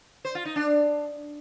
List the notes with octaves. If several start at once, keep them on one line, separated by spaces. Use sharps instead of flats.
C5
F4
D#4
D4